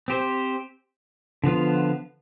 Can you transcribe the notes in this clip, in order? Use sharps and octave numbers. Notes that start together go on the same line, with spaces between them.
C4 G4 C5
D3 F3 B3 F4